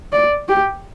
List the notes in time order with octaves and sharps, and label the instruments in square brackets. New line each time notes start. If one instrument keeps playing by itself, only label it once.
[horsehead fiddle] D5
G4